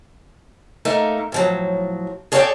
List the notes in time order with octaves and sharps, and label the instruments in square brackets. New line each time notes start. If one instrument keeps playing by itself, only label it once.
[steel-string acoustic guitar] A3 A#3 D#4
A2 F3 F#3
G#4 A4 C#5 D5 E5 G5